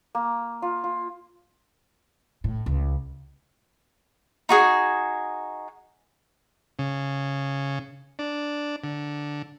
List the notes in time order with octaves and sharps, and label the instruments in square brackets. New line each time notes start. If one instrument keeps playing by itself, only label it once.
[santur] A#3
F4
F4
[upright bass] A2
C#2
[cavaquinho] D#4 F#4 G#4
[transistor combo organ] C#3
D4
D3